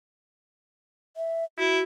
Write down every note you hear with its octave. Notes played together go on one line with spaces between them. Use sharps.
E5
E4 F#4